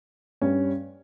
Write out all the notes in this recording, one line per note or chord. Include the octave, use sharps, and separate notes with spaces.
G2 G3 C#4